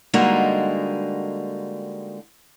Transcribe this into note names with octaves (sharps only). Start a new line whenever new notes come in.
D3 G3 G#3 A#3 D#4 F#4